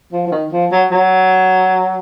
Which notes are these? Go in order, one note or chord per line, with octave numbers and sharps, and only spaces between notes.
F3
F3
D#3
F3
F#3
F#3